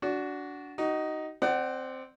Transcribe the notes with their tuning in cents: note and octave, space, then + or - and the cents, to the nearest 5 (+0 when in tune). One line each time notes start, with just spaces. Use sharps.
D4 -20 F#4 +5
D#4 +0 F#4 +35
C4 +0 D5 +30 F#5 +25